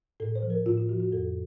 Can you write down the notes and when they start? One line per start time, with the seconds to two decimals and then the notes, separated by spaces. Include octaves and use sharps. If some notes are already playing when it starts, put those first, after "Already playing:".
0.20 A2 A4
0.35 C5
0.42 F3
0.50 A#4
0.66 A2 F4
0.78 F4
0.89 F3 F#4
1.00 F#4
1.12 F2 A4